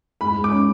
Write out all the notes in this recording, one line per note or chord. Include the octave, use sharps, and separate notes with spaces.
G#2 B5
G#2
D6
C#4